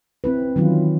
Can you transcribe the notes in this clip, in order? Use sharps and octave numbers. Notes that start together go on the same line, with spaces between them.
C4 E4 B4
D#3 E3 F#3 C#4 E4 F4